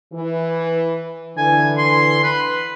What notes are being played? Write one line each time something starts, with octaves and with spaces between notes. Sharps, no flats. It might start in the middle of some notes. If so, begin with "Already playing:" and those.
E3
D3 E3 G#5
C6
B4